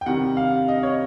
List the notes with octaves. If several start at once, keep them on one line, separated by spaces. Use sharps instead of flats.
G5
C3 D#3 G3 F#5
F5
D#5
C#5